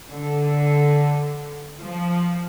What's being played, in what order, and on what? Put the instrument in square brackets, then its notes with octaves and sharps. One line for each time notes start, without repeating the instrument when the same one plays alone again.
[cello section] D3
F3